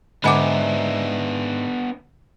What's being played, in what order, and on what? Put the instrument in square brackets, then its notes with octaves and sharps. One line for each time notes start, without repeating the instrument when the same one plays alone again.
[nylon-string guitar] G#2 E5 G#5 [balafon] D3 F#5 D6 [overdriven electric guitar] B3 D4